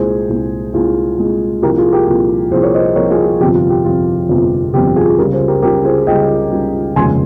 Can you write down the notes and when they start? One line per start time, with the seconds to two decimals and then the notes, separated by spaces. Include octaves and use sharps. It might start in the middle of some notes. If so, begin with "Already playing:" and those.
Already playing: C2 A#2 G#3 G#4 C5
0.30 C2 A#2 G#3
0.74 C2 A#2 G#3 F4 G#4
1.19 C2 A#2 G#3
1.62 C2 A#2 F3 G4 A#4
1.78 F4 G#4
1.93 G4 A#4
2.07 C2 A#2 F3
2.51 C2 A#2 F3 G#4 C5
2.63 A#4 C#5
2.74 C5 D#5
2.96 C2 A#2 F3 A#4 C#5
3.11 F4 G#4
3.26 F4
3.40 G1 F2 C3 F3 G4
3.55 F4
3.70 G4
3.85 G1 F2 C3 F3 F4
4.29 G1 F2 C3 F3
4.74 G1 F2 C3 F3 G4
4.96 F4 G#4
5.18 C#2 C#3 G3 G4 A#4
5.33 G#4 C5
5.48 G4 A#4
5.62 C#2 C#3 G3 G4 A#4
5.84 G#4 C5
6.07 C#2 C#3 G3 D#5 G5
6.52 C#2 C#3 G3
6.96 F1 D#2 C#3 F3 G#3 G#5 C6